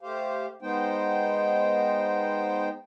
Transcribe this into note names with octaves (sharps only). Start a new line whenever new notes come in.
A3 G4 C5 F5
G#3 B3 D#4 C5 G5